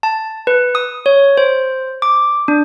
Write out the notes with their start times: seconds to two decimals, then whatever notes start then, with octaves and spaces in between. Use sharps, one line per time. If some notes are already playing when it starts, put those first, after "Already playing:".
0.03 A5
0.47 B4
0.75 D#6
1.06 C#5
1.37 C5
2.02 D6
2.48 D4